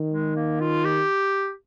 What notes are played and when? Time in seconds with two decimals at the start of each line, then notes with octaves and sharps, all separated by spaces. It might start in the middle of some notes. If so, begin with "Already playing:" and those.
Already playing: D#3
0.10 G#3
0.36 A#3
0.60 F4
0.85 G4